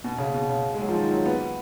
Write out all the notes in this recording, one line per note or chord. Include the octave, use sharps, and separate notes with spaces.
B2
C#3
B2
C#3
G#3
F#3
F3
D#3
F#3
B3